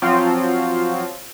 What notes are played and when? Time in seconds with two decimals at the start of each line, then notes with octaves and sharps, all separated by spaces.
0.02 F3 F#3 C4 F4